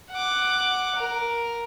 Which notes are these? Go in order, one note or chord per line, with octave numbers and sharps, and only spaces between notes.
F#5 D6
A#4